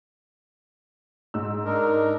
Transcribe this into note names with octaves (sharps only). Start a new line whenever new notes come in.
G#2 E6
D4 D#4 A#4